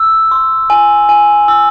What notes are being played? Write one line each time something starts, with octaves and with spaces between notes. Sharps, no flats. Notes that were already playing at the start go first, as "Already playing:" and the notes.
Already playing: E6
C6
G#5
G#5
E6